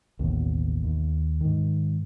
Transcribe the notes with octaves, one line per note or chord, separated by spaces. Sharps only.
A1 D#2 B2
D#2
G#2 D#3